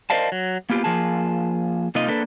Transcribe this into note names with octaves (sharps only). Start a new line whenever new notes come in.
A#4 C5 D5 D#5 F5 A5
F#3
A#3 B3 F4 G4
F3 A#3 F4 G#4 A5
C3 A#3 D#4 F4 D#5
A#3 D4 A4 B4